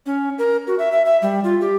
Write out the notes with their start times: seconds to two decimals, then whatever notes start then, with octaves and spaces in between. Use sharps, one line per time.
0.06 C#4
0.39 A#4
0.67 F#4
0.79 E5
0.92 E5
1.05 E5
1.22 G3
1.44 F4
1.61 G4